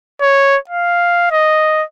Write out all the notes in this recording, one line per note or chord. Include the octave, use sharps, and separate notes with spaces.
C#5
F5
D#5